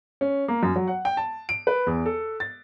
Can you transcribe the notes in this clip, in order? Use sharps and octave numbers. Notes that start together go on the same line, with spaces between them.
C#4
A#3
F#2
F#3
F#5
G5
A5
D7
B4
E2
A4
A6